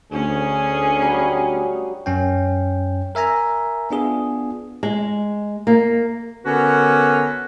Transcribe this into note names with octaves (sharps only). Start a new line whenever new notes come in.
D2 C#4 G#4
F#3 G3
F#2 C#4 G5
A#4 E5 G#5 A#5
B3 D4 F4 G#4
G#3
A#3
D3 B3 C#4 F#4 A#4 B4